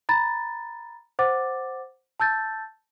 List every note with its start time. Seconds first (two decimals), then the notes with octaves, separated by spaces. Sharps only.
0.09 A#5 B5 A6
1.19 C5 F#5 D6 A6
2.20 A5 E6 G6 A6